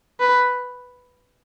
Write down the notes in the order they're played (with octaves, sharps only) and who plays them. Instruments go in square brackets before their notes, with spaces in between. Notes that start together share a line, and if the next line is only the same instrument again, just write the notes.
[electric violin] B4